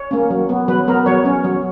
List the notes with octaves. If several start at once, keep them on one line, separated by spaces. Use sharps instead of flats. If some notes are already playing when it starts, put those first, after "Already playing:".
Already playing: C#5
A#3 C#4
F#3
B3
F#3 B4
B3 A#4
F#3 C#5
C#4
F#3